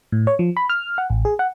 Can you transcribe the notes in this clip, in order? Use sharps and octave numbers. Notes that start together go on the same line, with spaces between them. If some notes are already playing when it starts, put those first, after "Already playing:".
A2
C#5
F3
B5
F6
F#5
A1
G#4
F#5